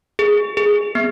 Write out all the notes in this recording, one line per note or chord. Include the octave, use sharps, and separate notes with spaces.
G#4
G#4
B3